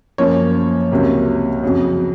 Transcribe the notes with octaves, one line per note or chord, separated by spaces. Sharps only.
F#2 F3 A#3 C#4 C#5
C#2 C3 F#3 A#3
F2 C#3 F#3